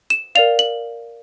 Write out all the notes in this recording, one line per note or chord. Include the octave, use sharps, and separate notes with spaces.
E7
A#4 D5 F5 F7
F#7